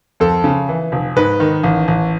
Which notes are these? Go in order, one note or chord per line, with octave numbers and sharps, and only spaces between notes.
F2 A4
C#3
E3
F1
G#2 B4
D#3
A1
A1